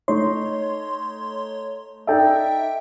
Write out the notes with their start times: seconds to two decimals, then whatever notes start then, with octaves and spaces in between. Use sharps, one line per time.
0.08 A3 D#4 C#5 C6
2.07 D#4 A4 D5 E5 G5